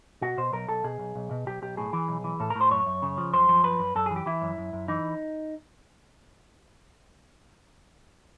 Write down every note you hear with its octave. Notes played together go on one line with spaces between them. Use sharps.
B2 F#4
B2 C5
B1 A#4
B1 A4
B2 G#4
B1
B1
B2
B1 G4
B1 G4
A2 G#4
E3
B1
E3
A2 A4
A#4
A2
C5
F#2 C#5
F#2
C#3
F3
F#2 C5
F3
F#2 B4
F#2
F#2 A4
E3 G#4
G4
E3 E4
F#2
F#2
F#2
E3 D#4